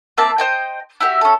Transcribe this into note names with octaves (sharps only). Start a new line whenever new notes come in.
A#3 C4 E5 A5
C5 D#5 G5
E4 F#4 G4 E5
C#4 A4